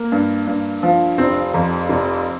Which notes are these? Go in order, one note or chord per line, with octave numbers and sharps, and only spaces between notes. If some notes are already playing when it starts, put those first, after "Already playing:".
Already playing: A#3
G2
G2
F3
F1 C4
F2
F1